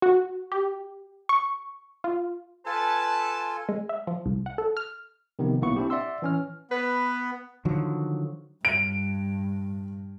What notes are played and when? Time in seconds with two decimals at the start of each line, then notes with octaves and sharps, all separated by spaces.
0.02 F#4
0.52 G4
1.29 C#6
2.04 F4
2.66 F4 A4 B4 G#5 A5
3.69 G#3
3.89 E5
4.07 F3
4.26 C2
4.46 F#5
4.58 A4
4.77 F6
5.39 C3 D#3 F3 B3
5.61 B1 F#3 A#3 B3 E4 C#6
5.76 C4 D4 E4 G4
5.90 D5 E5 F#5 C6 E6
6.22 E3 C#4 F6
6.71 B3 B4
7.65 D3 D#3 F3 F#3
8.65 G2 D7